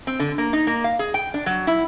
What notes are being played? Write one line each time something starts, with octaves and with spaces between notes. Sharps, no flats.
C4
D3
A#3
D#4
A#3
F5
G#4
G5
D4
F#3
E4